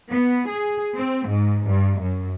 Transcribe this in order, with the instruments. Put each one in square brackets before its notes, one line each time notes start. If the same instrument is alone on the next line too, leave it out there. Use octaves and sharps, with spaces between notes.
[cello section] B3
G#4
C4
G#2
G2
F#2